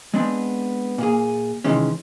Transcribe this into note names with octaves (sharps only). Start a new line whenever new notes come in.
G#3 B3 C4 D4
A#2 A#3 G#4
C3 D#3 E3 G#3 C#4